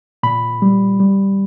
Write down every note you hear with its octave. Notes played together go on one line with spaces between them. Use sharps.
A#2 B5
G3
G3